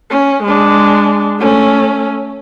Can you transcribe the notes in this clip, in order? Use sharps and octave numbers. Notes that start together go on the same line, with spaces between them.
C#4
G#3 D4
A3 C#4